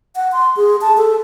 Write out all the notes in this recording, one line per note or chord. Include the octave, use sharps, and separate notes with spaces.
F#5
C6
G#4
A5
A4